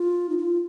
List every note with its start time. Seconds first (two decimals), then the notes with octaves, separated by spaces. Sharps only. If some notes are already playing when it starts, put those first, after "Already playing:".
Already playing: F4
0.29 D#4
0.38 F4